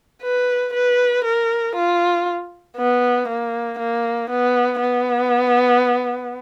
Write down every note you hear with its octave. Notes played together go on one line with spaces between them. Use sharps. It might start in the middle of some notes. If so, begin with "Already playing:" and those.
B4
B4
A#4
F4
B3
A#3
A#3
B3
B3